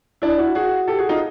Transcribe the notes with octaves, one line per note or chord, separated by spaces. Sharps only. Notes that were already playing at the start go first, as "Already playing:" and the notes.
D4 E4
E4 F#4
F#4 G#4
G4 A4
F#4 G#4
D#4 F4